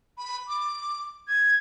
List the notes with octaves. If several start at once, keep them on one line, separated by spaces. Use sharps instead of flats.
B5
D6
G#6